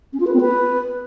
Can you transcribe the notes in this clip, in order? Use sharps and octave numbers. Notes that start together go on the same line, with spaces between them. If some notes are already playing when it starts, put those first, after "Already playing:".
C#4
F4
B4
C4
B4